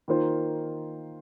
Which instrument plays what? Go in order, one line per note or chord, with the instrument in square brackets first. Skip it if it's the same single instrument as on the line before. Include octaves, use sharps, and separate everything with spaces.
[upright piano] D#3 A#3 F4 C5